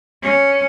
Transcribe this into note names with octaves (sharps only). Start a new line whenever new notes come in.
C#4